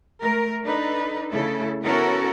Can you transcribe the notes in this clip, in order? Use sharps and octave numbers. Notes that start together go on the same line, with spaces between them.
A3 A#4
D4 D#4 A4 B4
C#3 A3 E4 A4
B3 C#4 E4 F#4 A4 A#4